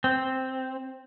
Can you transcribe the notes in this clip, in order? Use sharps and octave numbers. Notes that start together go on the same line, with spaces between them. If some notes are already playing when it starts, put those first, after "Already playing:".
C4